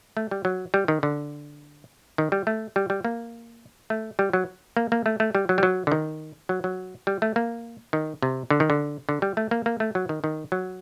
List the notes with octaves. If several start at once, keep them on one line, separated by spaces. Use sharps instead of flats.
A3
G3
F#3
G3
D#3
D3
D#3
G3
A3
G3
G3
A#3
A3
G3
F#3
A#3
A#3
A3
A3
G3
F#3
G3
F#3
D3
D#3
F#3
F#3
G3
A3
A#3
D#3
C3
D3
D#3
D3
D3
G3
A3
A#3
A#3
A3
F#3
D#3
D#3
F#3